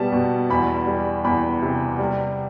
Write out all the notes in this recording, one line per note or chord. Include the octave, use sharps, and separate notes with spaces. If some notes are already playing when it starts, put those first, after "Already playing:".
Already playing: B2 G3 B3 A5
B2
E2 B5
G3
E2 B5
C3
G3